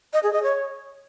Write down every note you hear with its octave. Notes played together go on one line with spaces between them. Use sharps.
D#5
G#4
D#5
C#5